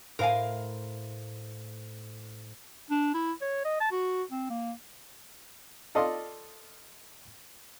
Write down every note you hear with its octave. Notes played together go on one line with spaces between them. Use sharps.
A2 A#4 C5 F5 G#5
D4
E4
C#5
D#5
A5
F#4
C4
A#3
F4 A4 D5 D#5 F5 C6